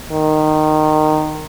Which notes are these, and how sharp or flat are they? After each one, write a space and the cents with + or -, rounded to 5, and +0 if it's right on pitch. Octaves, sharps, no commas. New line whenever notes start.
D#3 -15